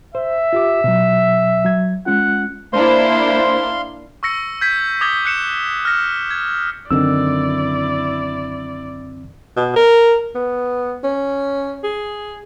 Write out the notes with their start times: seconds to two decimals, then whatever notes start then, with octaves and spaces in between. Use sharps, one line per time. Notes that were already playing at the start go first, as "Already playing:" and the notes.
0.15 C5 E5
0.53 F4 G4 D6
0.84 B2 F#3
1.65 F#3 G#6
2.06 G#3 C#4 F4 F#5
2.73 A#3 D4 E4 C5 F5 C6
4.23 C#6 E6 A#6 C#7
4.61 G6 G#6 B6
5.01 D6 D#6 G6 G#6 A#6 G7
5.25 F#6 C#7 E7
5.85 F6 A#6
6.31 G#6
6.91 F#2 D3 D#3 C4 E4 D5 E6
9.57 B2
9.76 A#4
10.35 B3
11.04 C#4
11.84 G#4